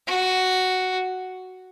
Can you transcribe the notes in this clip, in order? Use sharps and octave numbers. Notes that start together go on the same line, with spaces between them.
F#4